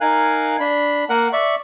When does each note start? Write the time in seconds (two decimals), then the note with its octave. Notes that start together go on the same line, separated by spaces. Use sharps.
0.01 D#4 A#4 F5 G#5 F#6
0.60 D4 B5
1.09 A#3 A#4 F#5
1.33 D5 E5 C#6